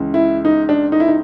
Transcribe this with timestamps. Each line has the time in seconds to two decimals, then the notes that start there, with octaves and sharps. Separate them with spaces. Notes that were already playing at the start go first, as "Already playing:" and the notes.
Already playing: C#2 C#3 E3
0.14 E4
0.45 D#4
0.69 D4
0.92 D#4
1.00 E4
1.08 D#4